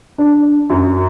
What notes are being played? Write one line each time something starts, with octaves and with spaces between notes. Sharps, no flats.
D4
F#2